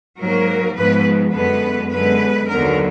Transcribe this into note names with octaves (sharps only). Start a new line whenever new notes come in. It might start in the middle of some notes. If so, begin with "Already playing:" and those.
G#2 F#3 A#3 A#4
G#2 F3 G#3 B3 B4
F#2 D3 G#3 B3 B4
F#2 D3 G#3 B3 B4
D#2 D3 F#3 B3 A#4